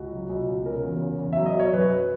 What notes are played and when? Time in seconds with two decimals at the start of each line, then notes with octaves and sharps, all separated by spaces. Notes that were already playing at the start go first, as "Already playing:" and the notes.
Already playing: C#2 F#4
0.12 F#3
0.29 C#2
0.48 B2
0.66 C#3 A#4
0.83 E2
1.01 C#3
1.19 E2
1.33 F#3 E5
1.46 D#5
1.55 F#3 C#5
1.73 F#2 B4